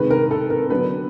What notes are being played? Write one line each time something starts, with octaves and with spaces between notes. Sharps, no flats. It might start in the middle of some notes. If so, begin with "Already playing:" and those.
Already playing: C3 D#3 G#3 B4
A#4
A4
A#4
D3 F#3 B3 B4